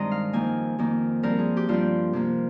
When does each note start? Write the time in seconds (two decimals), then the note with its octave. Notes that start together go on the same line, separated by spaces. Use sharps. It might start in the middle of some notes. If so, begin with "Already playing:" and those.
Already playing: G2 D#3 G#3 C4 D#5 A#5 C6
0.11 F5
0.33 F2 D#3 A#3 G#5
0.79 F2 D#3 A#3
1.23 G2 F3 C4 A#4
1.39 G#4
1.57 G4
1.69 G2 F3 C4 F4
2.13 C3 F3 A#3